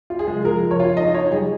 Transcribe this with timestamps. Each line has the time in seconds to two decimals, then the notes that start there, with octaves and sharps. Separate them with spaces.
0.10 F4
0.19 G#4
0.27 G#3
0.44 F3 A#4
0.63 F3
0.71 C#5
0.80 F4
0.97 D#4 D#5
1.14 D#4 C#5
1.31 G3 G#4